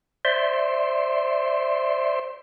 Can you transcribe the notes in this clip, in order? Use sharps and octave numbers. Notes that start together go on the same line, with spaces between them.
C5 D5 E5 C6